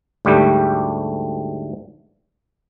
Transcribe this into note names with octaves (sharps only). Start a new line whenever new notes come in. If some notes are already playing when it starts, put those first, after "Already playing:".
D2 G#2 G3 A3 G4